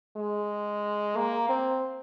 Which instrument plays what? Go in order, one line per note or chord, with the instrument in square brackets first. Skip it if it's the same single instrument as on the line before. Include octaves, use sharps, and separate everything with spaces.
[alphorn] G#3
A#3
C4